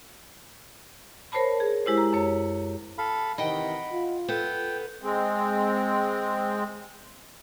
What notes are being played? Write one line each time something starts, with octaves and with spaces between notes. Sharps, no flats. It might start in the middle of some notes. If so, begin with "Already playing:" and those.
A#4 C5 C#5 A5 B5
G#4
G#3 E4 G4 C5
A#5
F#2 C#5
A4 F5 B5
C3 D#3 E3 D#5 F#5 G5 B5
F4
B3 A4 G5
G#3 C4